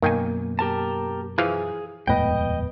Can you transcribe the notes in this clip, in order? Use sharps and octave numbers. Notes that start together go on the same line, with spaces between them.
F#2 B2 D#3 A#3 G5 G#5
G4 A#4 A5
E3 F3 G#4 F5
D#1 F2 A2 G#3 B3 B4 D#5 G5